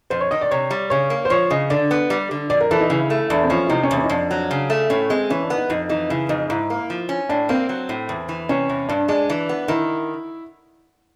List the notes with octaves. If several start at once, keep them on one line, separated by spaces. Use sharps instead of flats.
F2 C5
C#5
D#3 D#5
D5
C3 C#5
G3
C#3 C#5
A#3
C5
F3 C#5
C#3 D#5
D3 D5
B3
G3
D3
F2 D5
A#4
E3 A4
D#4
C#3 E4
A3
E2 D4
C4
F3 C#4
E4
C3 D#4
C#4
E2
C#4
D#4
F2 D4
F#3
C#3
A3
A2 C#4
G#3 C4
E3 C#4
D4
B3
D#4
F2 D#4
E3 D#4
C#3 E4
F2 D#4
G#2 E4
A#3
F3
C#4
A2 D4
A#3 C4
F#3
A2
E2
E3
C3 C#4
E2
G2 D4
G#3 D4
E3
B3
D#3 E4